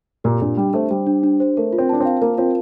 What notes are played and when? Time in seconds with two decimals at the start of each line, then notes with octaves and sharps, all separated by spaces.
0.24 A#2 G4
0.42 A#2 D4
0.57 G3 D4
0.74 A3 C5
0.90 G3 G4
1.07 D4
1.23 D4
1.40 C5
1.57 A3 A#4
1.73 F4
1.78 C4
1.89 D4 A5
2.00 C4 F5
2.22 A#3 A#4
2.38 C4 F4